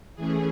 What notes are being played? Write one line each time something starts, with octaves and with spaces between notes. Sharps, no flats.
E3 A3 C#4 G#4